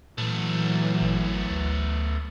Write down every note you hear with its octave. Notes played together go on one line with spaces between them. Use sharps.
A#2 E3 F#3 A3 B3
G#1
D2